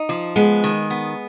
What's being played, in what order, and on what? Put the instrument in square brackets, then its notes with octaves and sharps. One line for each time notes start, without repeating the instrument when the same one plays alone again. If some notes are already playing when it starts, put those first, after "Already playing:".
Already playing: [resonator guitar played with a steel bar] D#4
F3
[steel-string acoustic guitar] G#3 [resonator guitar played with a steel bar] B3
[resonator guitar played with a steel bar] D#3
B3